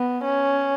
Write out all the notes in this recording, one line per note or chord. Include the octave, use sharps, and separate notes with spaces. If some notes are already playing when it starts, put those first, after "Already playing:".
Already playing: B3
C#4